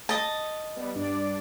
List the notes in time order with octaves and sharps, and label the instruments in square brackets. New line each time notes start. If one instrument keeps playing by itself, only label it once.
[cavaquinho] D#5 A5
[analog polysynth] G3 B3
G2 D4 D5